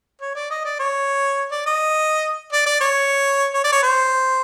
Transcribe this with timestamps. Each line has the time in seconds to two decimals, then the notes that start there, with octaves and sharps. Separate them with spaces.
0.21 C#5
0.35 D5
0.50 D#5
0.65 D5
0.79 C#5
1.52 D5
1.66 D#5
2.52 D5
2.66 D5
2.81 C#5
3.54 C#5
3.64 D5
3.72 C#5
3.83 C5